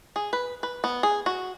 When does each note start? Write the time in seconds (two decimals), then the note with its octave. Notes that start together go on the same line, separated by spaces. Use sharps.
0.16 G#4
0.33 B4
0.63 B4
0.84 B3
1.03 G#4
1.26 F#4